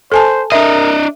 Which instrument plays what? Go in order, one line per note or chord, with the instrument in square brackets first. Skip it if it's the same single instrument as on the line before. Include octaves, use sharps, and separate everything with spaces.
[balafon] A4 G#5 A5 [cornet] C5
[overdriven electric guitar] D4 D#5 [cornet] A#4 [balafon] E5